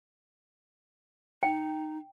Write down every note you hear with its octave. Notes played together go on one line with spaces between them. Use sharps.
D#4 G5